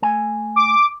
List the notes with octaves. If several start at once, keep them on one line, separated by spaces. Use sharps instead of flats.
A3 G#5
D6